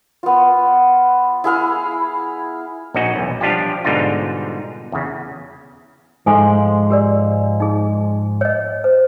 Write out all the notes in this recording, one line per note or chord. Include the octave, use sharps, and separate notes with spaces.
B3 F4
E4 G#4 F5
A#1 C#4 D#4 F#4 D#5
B1 E2
F3 G3 D4 F4 G4
G#2 B2 D3 G3 D#4 F4
E2 C#3
G#2 F3 G#3 D#4 A4 G#5
G4 A#4 D5
D#4 G#4
C#5 D#5
C5